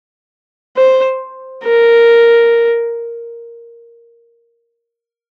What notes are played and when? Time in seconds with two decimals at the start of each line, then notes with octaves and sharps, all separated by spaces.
0.77 C5
1.64 A#4